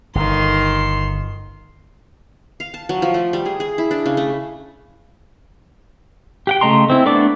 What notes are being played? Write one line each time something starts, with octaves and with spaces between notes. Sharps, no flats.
G1 D#3 C6
F5
A5
F#3
F3
A3
G3
G#4
G#4
E4
D4
C#3
A3
G4 F#5 G5
C#3 A3 D#5 A#5 C6
C4 E4
A3 B3 D4 D5 D6